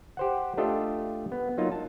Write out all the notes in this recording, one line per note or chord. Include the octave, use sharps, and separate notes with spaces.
G4 C5 F#5
A3 D4 F4 G4 A4 D#5
B3
F#3 A#3 D#4 F4
A5